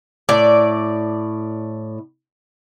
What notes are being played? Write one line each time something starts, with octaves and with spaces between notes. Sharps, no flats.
A2 D5